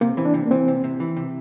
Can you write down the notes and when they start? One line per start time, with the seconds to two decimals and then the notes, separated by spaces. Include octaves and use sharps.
0.01 C3 A#3
0.17 E3 C4
0.25 D4
0.34 C3
0.46 A#3
0.51 E3 C4
0.68 C3
0.84 C3
1.00 E3
1.17 C3